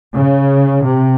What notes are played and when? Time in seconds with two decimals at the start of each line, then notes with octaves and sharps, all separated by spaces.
0.15 C#3
0.86 C3